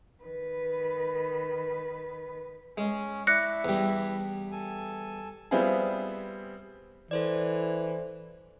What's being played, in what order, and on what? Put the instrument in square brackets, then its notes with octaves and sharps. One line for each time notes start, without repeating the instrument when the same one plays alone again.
[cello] D#3 B4
[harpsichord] G#3 [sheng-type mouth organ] C#4
[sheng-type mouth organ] E4 E5 [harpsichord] D5 [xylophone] F#6 A#6 C#7
[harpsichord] E2 G3
[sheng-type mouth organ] A4 G#5
[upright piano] G3 B3 C4 E4 F4 G#4
[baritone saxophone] E3 [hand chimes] A4 C5 D5